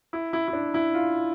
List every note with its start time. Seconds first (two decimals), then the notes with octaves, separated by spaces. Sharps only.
0.13 E4
0.33 E4
0.48 E4
0.53 D4
0.74 E4
0.94 F4